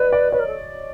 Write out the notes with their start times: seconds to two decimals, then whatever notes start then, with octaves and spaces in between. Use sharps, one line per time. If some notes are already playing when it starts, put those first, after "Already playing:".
Already playing: B4 D5 D#5
0.13 D5
0.32 B4 C#5
0.39 A#4
0.47 A4